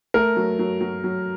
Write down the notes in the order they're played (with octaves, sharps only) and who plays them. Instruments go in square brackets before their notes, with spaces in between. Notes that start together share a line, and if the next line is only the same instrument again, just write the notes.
[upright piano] A3 [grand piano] A#4
[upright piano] F#3
F#3
F#3
F#3